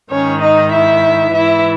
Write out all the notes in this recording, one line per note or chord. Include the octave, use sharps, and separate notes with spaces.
G#2 D#3 C#4 C#5
D#4 D#5
E4 E5
G#2 E3 E4 E5